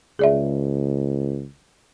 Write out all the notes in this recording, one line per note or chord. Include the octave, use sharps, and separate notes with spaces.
C#2 G#4 D5 E5